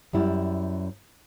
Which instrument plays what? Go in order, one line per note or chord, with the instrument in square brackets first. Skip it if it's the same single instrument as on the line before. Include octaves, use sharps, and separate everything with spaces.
[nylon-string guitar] F#2 G3 E4